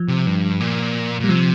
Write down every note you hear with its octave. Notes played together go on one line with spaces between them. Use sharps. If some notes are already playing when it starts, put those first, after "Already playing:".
Already playing: F3
C3
G2
A#2
A#2 G3
C3 F3